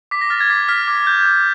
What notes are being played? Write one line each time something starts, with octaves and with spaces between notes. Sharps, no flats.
D6 B6
A#6
F6 A6
G#6
D6 B6
F6 B6
D6
G6
D6